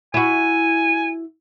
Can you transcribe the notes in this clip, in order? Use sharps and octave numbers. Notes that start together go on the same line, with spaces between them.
E4 F#4 G#5